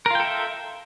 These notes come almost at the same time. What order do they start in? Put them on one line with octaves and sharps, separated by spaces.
A#4 F4 G5 A4 E5